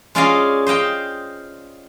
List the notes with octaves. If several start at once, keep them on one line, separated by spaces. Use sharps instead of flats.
G#3 C#4 F4 D5 D#5 F5
C5 D#5 F5 G5